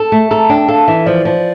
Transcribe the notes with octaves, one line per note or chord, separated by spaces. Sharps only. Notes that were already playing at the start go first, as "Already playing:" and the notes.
Already playing: A4 A5
A3
A4 A#5
D4 G5
A4 F5
E3 E5
F3 D5
F3